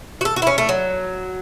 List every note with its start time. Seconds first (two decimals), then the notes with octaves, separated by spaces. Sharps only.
0.21 F#4
0.25 A4
0.36 F#4
0.42 E4
0.47 C#4
0.58 A3
0.69 F#3